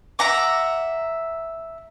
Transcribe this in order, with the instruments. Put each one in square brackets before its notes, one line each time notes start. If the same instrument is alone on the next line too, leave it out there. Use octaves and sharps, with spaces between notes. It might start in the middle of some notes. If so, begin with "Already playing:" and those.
[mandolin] E5 F#5 A#5 D6